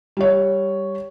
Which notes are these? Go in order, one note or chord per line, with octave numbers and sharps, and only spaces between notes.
G3 C#5